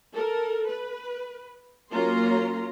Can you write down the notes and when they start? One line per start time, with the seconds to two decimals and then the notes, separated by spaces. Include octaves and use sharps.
0.13 A4 A#4
0.68 B4
1.91 F#3 A#3 C#4 F4 A#5 C6